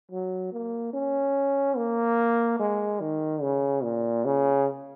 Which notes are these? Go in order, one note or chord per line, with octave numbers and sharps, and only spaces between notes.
F#3
A#3
C#4
A#3
G#3
D#3
C#3
A#2
C#3